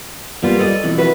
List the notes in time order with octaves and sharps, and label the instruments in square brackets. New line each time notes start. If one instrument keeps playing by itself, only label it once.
[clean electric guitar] G3 [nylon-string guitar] A#3 B3 F4
[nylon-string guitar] A4 D5 D#5
[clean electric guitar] F2 B2 E3
[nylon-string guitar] F#4 B4 E5